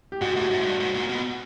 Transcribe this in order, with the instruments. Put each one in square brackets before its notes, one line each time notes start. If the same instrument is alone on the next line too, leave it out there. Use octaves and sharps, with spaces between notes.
[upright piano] G4
[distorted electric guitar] G#2 [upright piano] F#4
[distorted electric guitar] A2 [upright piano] F#4
[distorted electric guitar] G#2
G#2
G2
G#2
A#2
B2